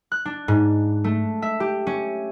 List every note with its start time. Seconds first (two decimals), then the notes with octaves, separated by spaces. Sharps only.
0.12 F#6
0.25 D4
0.48 G#2
1.04 A3
1.42 E5
1.60 G4
1.87 C#4